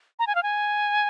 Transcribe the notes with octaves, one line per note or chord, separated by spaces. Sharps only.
A#5
G#5
F5
G#5